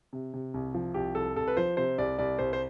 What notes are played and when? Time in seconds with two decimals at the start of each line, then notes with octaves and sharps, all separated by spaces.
0.13 C3
0.34 C3
0.54 C2
0.74 F3
0.94 C2 G4
1.15 C2 A4
1.36 C2 A4
1.48 B4
1.57 F3 C5
1.77 C3 C5
1.98 C2 D5
2.18 C2 D5
2.39 C2 C5
2.53 C5